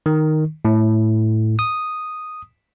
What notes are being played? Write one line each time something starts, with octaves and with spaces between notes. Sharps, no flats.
D#3
A2
D#6